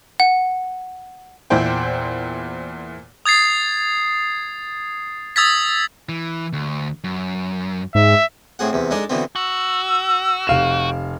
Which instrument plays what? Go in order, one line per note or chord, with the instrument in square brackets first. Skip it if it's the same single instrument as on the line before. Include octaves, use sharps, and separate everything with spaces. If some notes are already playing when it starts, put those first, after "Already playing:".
[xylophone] F#5
[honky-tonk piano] E2 A#2 E4 C5 G5
[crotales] D#6 G#6 A6 C7
D#6 E6 G#6 A6 B6
[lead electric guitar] E3
D2
F#2
[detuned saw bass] G#2 [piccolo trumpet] E5
[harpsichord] A2 C4 G#4 F#5
E2 C3
G#3 D4 D#4 A4 D5
B2 D3 E3 B3 C4
[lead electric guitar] F#4 [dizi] E6
[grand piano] F1 F5 E7 [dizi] G5